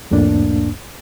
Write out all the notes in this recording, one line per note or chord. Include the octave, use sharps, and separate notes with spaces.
C2 F2 A2 A#3 D4